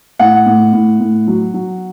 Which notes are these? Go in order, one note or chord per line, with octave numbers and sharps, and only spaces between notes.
A2 F#5
A2
A2
A2
F#3
F#3